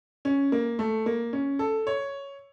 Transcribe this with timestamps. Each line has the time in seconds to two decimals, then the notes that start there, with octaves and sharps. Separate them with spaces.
0.25 C#4
0.52 A#3
0.79 A3
1.06 A#3
1.33 C#4
1.59 A4
1.87 C#5